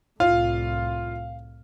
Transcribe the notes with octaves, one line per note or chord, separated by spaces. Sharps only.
C2 A2 F4 F5